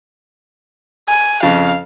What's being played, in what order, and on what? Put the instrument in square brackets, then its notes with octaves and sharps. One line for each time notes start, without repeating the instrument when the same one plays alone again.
[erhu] G#5
[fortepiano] F2 C#3 [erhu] F5